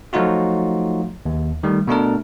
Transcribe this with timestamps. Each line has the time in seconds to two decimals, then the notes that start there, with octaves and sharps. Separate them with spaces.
0.13 F3 F#3 A3 D#4 F4 F#4
1.25 D#2
1.63 D#3 G3 A3
1.88 B2 A3 D4 A#4